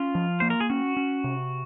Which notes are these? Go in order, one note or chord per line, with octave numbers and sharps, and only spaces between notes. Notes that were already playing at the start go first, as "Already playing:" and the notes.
Already playing: C#4 F4
F3
A#3 C5
A#4
G#4
C#4 F#4
C#4
C3